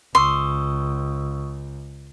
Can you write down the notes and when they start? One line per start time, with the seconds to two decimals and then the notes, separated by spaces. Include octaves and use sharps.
0.15 C#2 C6 C#6 D#6 E6